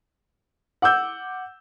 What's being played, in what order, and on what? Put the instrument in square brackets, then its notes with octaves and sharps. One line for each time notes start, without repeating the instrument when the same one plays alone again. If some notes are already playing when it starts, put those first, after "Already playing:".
[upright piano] F#5 D6 E6 G6